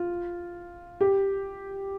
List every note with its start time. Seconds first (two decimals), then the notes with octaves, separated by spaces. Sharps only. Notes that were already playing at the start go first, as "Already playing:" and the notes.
Already playing: F4
1.01 G4